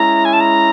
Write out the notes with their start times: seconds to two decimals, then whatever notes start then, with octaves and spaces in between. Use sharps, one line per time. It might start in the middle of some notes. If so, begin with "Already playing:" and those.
Already playing: G#3 C#4 E4 A#5
0.25 G#5
0.33 A5
0.40 A#5